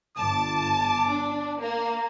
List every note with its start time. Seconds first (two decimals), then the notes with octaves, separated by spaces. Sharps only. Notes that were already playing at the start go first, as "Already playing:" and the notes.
0.17 G1 A5 D6
1.09 D4
1.60 A#3